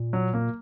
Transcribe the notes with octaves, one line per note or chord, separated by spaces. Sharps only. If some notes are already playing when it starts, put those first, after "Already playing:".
Already playing: A#2
F#3
A#3